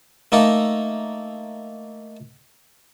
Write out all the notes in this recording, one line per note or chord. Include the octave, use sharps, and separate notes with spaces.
A3 A#3 D#4 A4 A#4